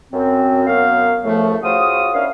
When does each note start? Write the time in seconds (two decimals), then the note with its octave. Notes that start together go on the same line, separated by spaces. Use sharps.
0.12 F#2 C4
0.67 F#2 F#3 B3 F5
1.24 F#2 A2 C#3 E3 F3 A3
1.63 C#3 F4 F#4 C5 D#6
2.13 B3 C#4 D4 E4 A#4 F5